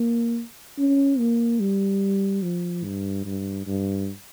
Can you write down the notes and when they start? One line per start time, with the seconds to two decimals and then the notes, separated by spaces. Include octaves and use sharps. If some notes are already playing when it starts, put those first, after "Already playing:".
Already playing: A#3
0.78 C#4
1.19 A#3
1.60 G3
2.43 F3
2.84 G2
3.25 G2
3.67 G2